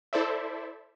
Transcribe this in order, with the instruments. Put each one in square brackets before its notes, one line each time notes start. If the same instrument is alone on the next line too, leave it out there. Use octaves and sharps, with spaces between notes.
[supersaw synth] E4 A4 C5 D5 E5